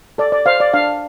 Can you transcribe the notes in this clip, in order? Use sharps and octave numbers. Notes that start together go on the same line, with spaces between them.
A4 D5
D5
C5 F5
D5
D4 F5